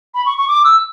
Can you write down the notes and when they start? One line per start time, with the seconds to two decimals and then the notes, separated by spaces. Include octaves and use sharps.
0.14 B5
0.26 C#6
0.37 C#6
0.48 D6
0.64 E6